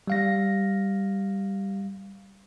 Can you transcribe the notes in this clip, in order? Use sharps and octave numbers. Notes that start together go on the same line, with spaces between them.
G3 F5 A#6